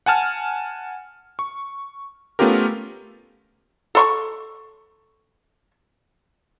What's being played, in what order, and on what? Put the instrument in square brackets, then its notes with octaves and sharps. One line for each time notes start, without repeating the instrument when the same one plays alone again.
[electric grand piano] F#5 G#5 A5 F6
C#6
A3 B3 C#4 F4 G4 A#4
[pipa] A4 C6 C#6